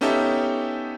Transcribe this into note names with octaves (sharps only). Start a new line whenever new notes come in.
B3 C#4 D#4 G4 A4 E5